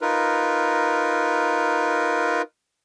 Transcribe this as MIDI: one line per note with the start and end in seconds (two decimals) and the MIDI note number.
0.01 2.42 63
0.01 2.42 65
0.01 2.42 70
0.01 2.42 71